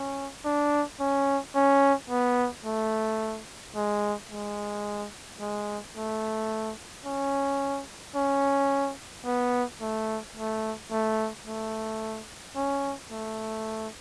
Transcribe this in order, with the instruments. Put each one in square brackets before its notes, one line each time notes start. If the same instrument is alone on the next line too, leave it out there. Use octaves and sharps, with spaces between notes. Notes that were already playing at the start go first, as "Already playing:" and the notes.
Already playing: [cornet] C#4
D4
C#4
C#4
B3
A3
G#3
G#3
G#3
A3
C#4
C#4
B3
A3
A3
A3
A3
C#4
A3